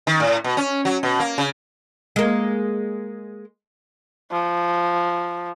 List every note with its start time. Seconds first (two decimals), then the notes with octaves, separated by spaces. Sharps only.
0.07 D#3
0.20 A2
0.44 B2
0.57 C#4
0.85 F#3
1.03 B2
1.20 A#3
1.38 C#3
2.16 G#3 A#3
4.31 F3